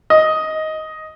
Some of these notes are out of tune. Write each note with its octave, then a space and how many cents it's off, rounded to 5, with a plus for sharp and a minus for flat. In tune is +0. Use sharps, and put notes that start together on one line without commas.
D#5 +10